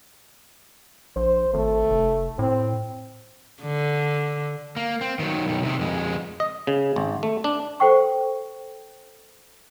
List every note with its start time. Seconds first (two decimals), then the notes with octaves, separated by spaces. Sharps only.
1.16 A#1 C5
1.54 G#1 A3
1.90 F1
2.39 A2 C4
3.62 D3
4.76 A#3
5.01 C4
5.19 D#3 F#3
5.46 B1 D#3
5.63 C3 D#3
5.79 F2 G#3
6.40 D#5
6.67 C#3
6.96 G#1
7.23 A3
7.44 D4
7.80 A4 C5 F#5 G5 C#6